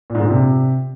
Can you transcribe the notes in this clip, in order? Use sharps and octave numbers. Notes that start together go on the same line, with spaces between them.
A#2
G#2
D3
A#2
C3